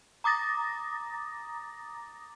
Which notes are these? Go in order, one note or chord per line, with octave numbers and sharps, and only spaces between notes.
A#5 D6 D#6 A6 A#6